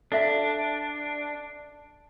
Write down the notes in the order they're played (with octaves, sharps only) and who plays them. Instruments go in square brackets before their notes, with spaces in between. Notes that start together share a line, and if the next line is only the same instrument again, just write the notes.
[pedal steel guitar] D4 [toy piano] A4 E5 F5